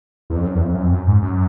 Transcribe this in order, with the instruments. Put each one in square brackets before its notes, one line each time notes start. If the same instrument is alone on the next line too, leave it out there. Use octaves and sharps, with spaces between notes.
[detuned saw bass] E2
F2
F#2
E2
F2
F#2
F2
F#2
G#2
F#2